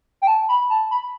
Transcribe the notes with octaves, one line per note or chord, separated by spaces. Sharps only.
G5
A5
B5
A5
B5